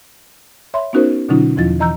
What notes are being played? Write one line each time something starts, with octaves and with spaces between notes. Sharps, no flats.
C#5 E5 B5 C6
B3 C#4 D#4 F#4 A#4 C5
B2 D3 F#3 C#4 D#4 F4
E2 F3 E4 F4 D#5 A6
E3 D#5 A#5 E6 G6